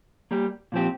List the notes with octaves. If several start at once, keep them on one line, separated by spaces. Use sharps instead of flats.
G3 A#3 G4
A#2 F3 C4 G4